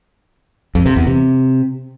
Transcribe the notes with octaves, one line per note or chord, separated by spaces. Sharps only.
F2
C3
E2
C3